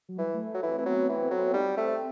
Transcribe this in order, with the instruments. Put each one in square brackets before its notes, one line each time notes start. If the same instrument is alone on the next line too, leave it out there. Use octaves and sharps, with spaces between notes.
[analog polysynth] F#3
[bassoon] E3 [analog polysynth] G3
[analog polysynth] A3
[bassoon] F#3
E3
[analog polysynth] C4
[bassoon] E3
[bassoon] F#3 [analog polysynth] B3
[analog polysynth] C4
[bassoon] E3
[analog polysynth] C4
[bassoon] F#3
[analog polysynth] C4
[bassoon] G3 [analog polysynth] D#4
[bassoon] A3 [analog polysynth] C4